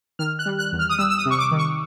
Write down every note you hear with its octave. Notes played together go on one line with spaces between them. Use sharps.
D#3 F6
F#6
G3
F#6
E2
F6
D#6
G3 E6
E6
D#6
C3
C#6
D6
D#3
C#6